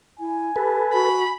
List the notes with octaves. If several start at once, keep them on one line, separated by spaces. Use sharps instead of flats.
E4 G#5
G4 A4 B4
F#4 B5